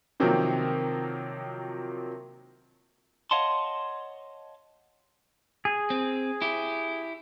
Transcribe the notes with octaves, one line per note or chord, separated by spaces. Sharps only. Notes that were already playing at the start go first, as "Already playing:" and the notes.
C3 D#3 F3 F#3 A#3 C4
C#5 D#5 F5 F#5 A5 C6
G#4
C4
E4 G4